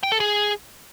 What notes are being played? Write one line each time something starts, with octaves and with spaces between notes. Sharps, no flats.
G5
A4
G#4